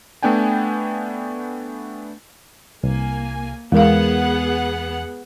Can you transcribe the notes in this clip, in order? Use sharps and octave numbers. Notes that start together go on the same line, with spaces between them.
A3 B3 D4 G5 G#5
C2 A#3 G#5
E2 G#3 B3 G#4 A#4 F5 F#5